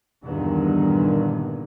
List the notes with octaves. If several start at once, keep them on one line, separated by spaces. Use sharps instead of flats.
E2 G2 A#2 D3 D#3